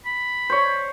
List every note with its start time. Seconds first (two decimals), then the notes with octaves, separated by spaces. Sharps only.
0.06 B5
0.50 C5 C#5